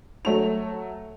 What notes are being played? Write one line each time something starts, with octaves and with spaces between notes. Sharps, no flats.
F#3 A3 F7